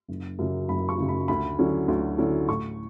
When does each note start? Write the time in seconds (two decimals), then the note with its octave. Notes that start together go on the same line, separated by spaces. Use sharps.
0.08 F#1
0.39 F#2 C#3 F#3
0.69 F#1 B5
0.89 C#6
0.98 F#2 C#3 F#3
1.09 B5
1.28 D2 B5
1.59 D3 F#3 C#4 E4
1.88 D2
2.18 D3 F#3 C#4 E4
2.49 A2 C#6